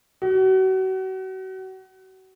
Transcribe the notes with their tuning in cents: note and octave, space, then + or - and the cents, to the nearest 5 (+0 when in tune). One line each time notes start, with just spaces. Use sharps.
F#4 +35